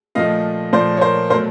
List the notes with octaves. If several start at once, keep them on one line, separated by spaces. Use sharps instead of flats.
A#2 F3 A3 D#5 F5
A#2 F3 A3 C5 D5
C#5
A#4 C5
B2 F#3 A3 A#4 C5